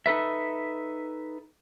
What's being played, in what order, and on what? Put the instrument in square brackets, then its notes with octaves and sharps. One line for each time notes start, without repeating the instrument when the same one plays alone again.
[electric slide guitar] D#4 A4 B4 E5